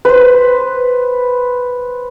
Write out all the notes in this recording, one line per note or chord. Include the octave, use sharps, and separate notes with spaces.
B4 C5